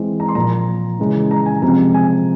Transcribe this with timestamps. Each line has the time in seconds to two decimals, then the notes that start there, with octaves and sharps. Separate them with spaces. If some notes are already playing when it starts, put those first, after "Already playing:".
Already playing: E3 G#3 C4
0.20 A#5
0.29 C6
0.35 A#2 F3 A#3 A#5
0.99 C#3 E3 G#3
1.31 A#5
1.46 G#5
1.62 C3 F3 G#3 C4 A#5
1.94 G#5